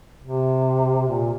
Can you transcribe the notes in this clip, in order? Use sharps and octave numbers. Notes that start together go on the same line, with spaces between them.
C3
A#2